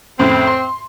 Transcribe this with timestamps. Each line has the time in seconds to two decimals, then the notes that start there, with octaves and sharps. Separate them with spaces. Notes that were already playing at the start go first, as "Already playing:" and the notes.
0.19 F2 A2 C#3 C4
0.47 C6